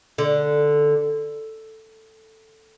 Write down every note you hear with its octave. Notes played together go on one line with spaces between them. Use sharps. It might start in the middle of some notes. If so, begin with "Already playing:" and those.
D3